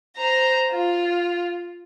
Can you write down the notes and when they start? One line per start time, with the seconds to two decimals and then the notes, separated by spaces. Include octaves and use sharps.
0.16 C5 A#5
0.72 F4